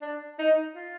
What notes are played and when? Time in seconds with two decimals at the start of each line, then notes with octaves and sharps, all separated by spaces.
0.02 D4
0.39 D#4
0.76 F4